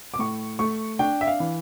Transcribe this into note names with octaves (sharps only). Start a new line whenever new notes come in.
D6
A2 C#6
A3 C#6
D4 G5
E5
F5
E3